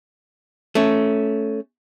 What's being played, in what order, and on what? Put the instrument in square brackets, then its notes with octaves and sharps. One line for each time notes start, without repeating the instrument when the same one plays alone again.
[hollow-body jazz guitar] A3 C#4